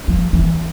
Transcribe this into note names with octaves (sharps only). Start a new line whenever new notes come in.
F3
E3